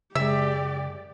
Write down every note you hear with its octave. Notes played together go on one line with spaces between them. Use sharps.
F#2 C#3 G#3 G4 D5 E5